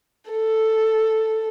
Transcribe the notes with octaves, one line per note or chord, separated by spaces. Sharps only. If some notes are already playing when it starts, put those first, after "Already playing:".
A4